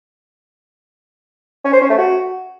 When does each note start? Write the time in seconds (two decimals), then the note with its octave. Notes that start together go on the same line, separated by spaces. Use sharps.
1.65 C#4
1.73 C5
1.81 C#4
1.90 A3
1.98 F#4